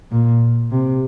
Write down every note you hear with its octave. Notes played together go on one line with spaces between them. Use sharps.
A#2
C3